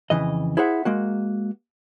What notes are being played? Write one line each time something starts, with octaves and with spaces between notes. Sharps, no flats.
F2 C#3 E3 D#5
E4 G#4 C5 E5 F#5
G#3 A#3 F#4